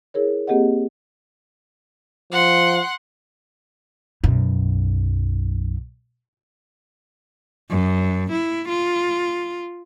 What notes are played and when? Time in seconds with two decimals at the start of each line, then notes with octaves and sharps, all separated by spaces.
0.14 E4 G#4 A#4 C#5
0.47 A#3 C4 G4 G#4 D#5 F#5
2.32 F3 F#5 C6
4.24 B1 F#2
7.70 F#2
8.32 E4
8.69 F4